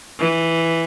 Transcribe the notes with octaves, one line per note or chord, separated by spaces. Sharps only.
E3